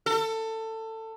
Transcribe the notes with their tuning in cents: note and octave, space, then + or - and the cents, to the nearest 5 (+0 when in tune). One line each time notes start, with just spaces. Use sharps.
A4 +20